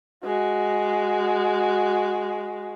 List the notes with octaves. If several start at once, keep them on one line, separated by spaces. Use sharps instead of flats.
G#3 F#4